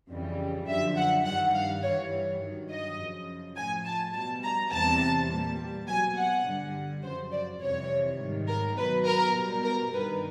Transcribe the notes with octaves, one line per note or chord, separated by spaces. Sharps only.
F2 C#3 E3 G3
F#2 D3 F3 E5
F#5
G2 D#3 G3 F#5
F5
G2 E3 G3 C#5
G2 D#3 F#3
D#5
F#2 C#3 F3
A2 F3 G#5
A5
B2 G3 A5
A#5
E2 C3 E3 G3 A5
A#2 G3
B2 F#3 G#5
F#5
G2 D3 G3
F#2 C#3 F3 C5
D5
F2 C3 E3 G3 C#5
G#2 D#3 G3
A#4
B2 F#3 B4
A#4
B2 G3
A#4
G2 D#3 G3 B4